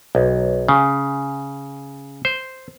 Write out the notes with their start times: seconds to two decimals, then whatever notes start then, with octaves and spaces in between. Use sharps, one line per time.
0.15 B1
0.69 C#3
2.25 C5